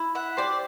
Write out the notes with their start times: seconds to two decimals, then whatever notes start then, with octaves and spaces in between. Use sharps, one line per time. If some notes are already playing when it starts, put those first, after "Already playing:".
Already playing: E4
0.15 E5 F#5
0.37 G4 C5 D5